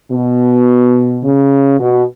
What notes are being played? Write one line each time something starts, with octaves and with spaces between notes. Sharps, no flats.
B2
C#3
B2